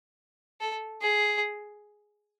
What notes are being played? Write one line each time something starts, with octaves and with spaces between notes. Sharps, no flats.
A4
G#4